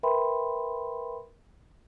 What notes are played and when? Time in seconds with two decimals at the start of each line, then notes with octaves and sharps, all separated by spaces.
0.03 A#4 B4 E5 G5 B5 C6